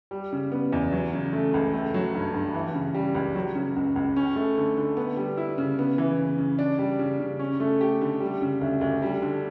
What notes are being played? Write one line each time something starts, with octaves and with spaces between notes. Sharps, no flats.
G3
C#3
B3
E2
F#3
C#3
A3
C#2
A3
F#3
G2
G2
E3
C#3
G3
C#2
F#3
C#3
C#2
C#2
C#4
A3
D3
D3
B3
G3
E4
C#3
B3
E3
C#3
C#3
D4
G3
C#3
C#3
C#4
A3
G4
D3
G3
C#3
D2
D2
G3
D3